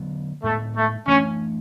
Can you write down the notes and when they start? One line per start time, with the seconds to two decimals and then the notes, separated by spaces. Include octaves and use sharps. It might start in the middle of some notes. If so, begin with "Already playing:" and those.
Already playing: D3 F#3 B3
0.43 A2 G#3 A3 B3
0.76 A3
1.07 E3 A3 C#4 D4